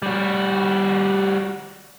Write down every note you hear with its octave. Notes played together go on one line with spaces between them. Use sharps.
G3 F#4